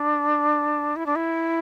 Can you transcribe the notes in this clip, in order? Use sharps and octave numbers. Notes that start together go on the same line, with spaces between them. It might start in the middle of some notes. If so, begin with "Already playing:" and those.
Already playing: D4
E4
D4
E4